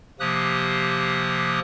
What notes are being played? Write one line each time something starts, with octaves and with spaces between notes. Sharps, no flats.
C3 F3 A#3 G4 D#6 F#6